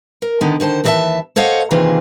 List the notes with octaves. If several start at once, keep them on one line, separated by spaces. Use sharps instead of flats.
A#4
D3 D#3 B3
D3 D#3 C5 A5
D#2 E3 A4 D#5 E5 A5
A4 C5 C#5 D#5 F5 F#5
C3 D#3 E3 A#3 F4 G#4